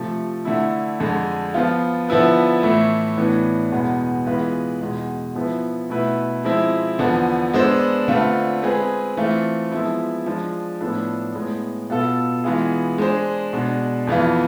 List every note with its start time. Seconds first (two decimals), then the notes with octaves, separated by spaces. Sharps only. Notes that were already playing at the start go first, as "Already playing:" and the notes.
Already playing: C3 F3 A3
0.45 D3 A3 E4
1.00 F2 D3 G#3
1.54 F3 B3 F4
2.08 D3 F3 B3 E4 B4
2.63 A2 E3 A3 E4
3.17 A2 E3 B3 D4
3.72 E2 B2 G#3 B3
4.26 E3 G#3 B3 F4 B4
4.81 E2 B2 G#3
5.35 F3 B3 E4 B4
5.90 B2 A3 E4 B4
6.44 F3 G#3 C4 E4
6.99 E2 D3 F3 B3
7.54 G#3 B3 D4 A4 C5
8.08 D3 A3 C4 F4 B4
8.63 G#3 C4 G#4 B4
9.17 E3 A3 C4 F4
9.71 F3 G#3 B3 E4
10.26 F3 G#3 D4
10.81 A2 F3 B3 D4 A4
11.35 A2 G#3 B3
11.90 B2 B3 F4 A4
12.44 E3 G#3 B3 F4 G#4
12.98 G#3 D4 G#4 C5
13.53 B2 G#3 D4
14.07 F2 E3 B3 F4